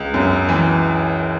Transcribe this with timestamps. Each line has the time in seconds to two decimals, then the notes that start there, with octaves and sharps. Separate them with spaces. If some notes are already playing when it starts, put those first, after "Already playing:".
Already playing: C#2
0.14 F#2
0.49 E3